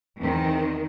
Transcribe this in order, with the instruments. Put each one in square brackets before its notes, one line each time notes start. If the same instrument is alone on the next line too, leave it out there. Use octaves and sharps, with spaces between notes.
[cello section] E2 D#3 E3 [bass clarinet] C4